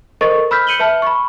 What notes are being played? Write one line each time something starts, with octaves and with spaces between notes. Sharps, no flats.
A4 A#4 C5 D#5 C#6 A6
B5 E6 F6 G6 B6
G6 C#7 D#7 F#7 G7
B4 E5 A5 F6
B5 C#6